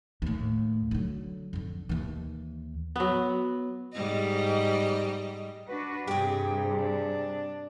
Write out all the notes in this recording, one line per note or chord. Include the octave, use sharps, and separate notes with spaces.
D#2 A2
D3 F#3
F2 D3
D#2 E3
F#3 B3
G#2 G3 D#5
D4 F#4 B4
G2 C3 G4 G#4
D4